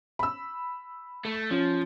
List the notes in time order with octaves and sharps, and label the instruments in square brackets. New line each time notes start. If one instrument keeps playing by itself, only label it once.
[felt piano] B5 E6
[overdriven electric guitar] A3
[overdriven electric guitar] F3 [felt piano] C#4